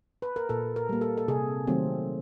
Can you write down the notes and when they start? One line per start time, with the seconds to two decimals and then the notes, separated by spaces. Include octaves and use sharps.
0.22 B4
0.36 A#4
0.49 A#2 A4
0.76 A#4
0.89 G3 A#3
1.01 A4
1.17 A4
1.28 C3 G#4
1.67 D#3 F#3 A3 C4